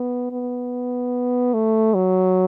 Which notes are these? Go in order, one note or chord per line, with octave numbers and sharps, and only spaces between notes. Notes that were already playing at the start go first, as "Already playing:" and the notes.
Already playing: B3
B3
A3
F#3